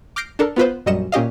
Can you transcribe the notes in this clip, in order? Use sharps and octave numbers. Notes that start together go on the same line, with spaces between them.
D6 F6 G6 A#6 C7 D7
D4 A4 A#4
B3 F4 B4 C5
A#1 F#2 G3 D#5 C#7 E7
A#2 C#4 G4 D#5 F5